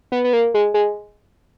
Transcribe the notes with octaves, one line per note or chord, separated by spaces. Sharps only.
B3
B3
A#3
G#3
G#3